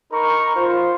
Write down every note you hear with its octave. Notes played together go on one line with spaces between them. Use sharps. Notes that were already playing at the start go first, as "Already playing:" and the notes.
D#4 A#4 A#5 B5 C#6
F4 C5